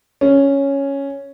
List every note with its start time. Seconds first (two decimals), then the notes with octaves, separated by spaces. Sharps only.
0.21 C#4